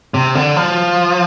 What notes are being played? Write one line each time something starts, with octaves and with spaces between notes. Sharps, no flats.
C3
D3
F3